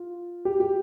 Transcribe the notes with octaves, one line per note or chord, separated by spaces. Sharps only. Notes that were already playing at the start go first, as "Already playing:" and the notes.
Already playing: F4
G4
G4